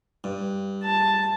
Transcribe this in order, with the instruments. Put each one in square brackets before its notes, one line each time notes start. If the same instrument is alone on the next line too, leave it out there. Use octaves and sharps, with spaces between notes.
[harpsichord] G2
[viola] A5